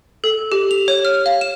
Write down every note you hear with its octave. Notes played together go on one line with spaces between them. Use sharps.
A4
G4
F7
C#5
F6
F5
E7